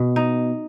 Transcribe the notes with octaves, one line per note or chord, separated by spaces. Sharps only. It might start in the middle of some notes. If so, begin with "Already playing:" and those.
Already playing: B2
D#4